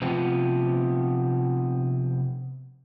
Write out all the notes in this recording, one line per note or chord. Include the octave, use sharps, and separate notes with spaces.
C3 F3 B3 C4